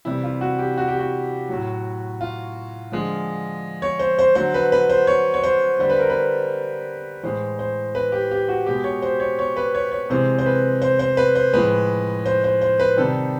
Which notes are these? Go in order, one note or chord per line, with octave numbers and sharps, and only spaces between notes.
C3 E3 G3 E4
F4
F#4
G4
F#4
G4
F#4
A2 F#3
F4
D3 F3 G#3
C#5
C5
C5
D3 F#3 C5
B4
B4
C5
C#5
C#5
C5
D3 G3 C5
B4
A#4
B4
A2 E3 G#3 C5
C5
B4
G4
G4
F#4
B2 G#3 G4
C#5
C5
C#5
C#5
B4
C#5
C#5
C3 E3 G#3 C5
C5
B4
C5
C5
B4
C5
A2 F3 G#3 B4
C5
C5
C5
B4
C3 D#3 G3 A4